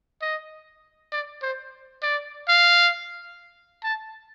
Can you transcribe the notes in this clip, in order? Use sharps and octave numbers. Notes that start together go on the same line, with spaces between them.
D#5
D5
C5
D5
F5
A5